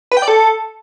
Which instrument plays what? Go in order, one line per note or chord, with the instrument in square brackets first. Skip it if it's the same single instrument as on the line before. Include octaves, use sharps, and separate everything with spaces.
[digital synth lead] B4
G5
D5
A4